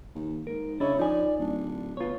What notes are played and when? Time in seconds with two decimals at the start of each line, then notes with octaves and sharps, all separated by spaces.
0.15 D#2
0.47 G#2 A#4
0.80 C#3 D4 E4 C#5 D#5
0.99 F3 D#4 D5 G#5
1.39 D1 D4
1.97 B3 F4 C#5